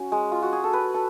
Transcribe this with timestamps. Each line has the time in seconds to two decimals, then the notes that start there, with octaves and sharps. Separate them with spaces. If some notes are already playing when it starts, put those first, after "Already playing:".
Already playing: C#4 F#4
0.12 G#3
0.32 F4
0.42 F#4
0.52 G#4
0.64 A4
0.73 B4
0.94 A4